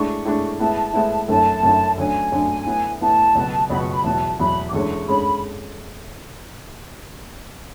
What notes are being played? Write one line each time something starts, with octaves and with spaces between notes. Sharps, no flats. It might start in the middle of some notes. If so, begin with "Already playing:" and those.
Already playing: A2 G#3 D4 C#6
A2 G#3 D4
A2 G#3 B3 E4 A5
A2 G#3 B3 E4
F#2 D3 A3 C#4 E4 A5
F#2 D3 A3 C#4 E4
D2 D3 F#3 C#4 G#5
D2 D3 F#3 C#4
A2 E3 B3
A2 E3 B3 A5
C#2 B2 F#3 B3
C#2 B2 F#3 B3 B5
C#6
B5
E2 B2 F#3 A5
E2 B2 F#3 B5
D6
E2 D3 G#3 C#4 C#6
D3 G#3 C#4 B5